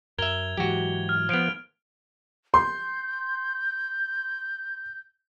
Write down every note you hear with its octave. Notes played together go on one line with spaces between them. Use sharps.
F#2 A#4 E5 G#6 F7 G7
G#2 E3 F#3 F#4 G4
F6
F3 B3 G#6 D7 F7
C6 G6